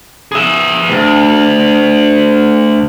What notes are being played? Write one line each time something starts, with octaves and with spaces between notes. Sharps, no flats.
G#4 E5
D2